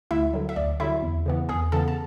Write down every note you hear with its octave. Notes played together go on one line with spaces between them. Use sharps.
D2 E4 E5
D3 F#3
E5
D2 D5
D3 F#3 E4 E5
E2
C#3 E3 B3
E2 G#4 G#5
C#3 E3 B3 A4 A5
A5